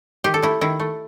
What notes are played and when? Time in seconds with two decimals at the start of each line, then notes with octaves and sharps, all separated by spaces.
0.24 D#3 G4
0.34 A4
0.42 A3 E4
0.61 D#3 E4
0.80 A3